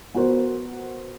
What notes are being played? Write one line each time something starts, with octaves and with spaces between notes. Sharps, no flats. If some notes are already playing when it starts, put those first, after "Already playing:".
B3 F#4 A#4 C5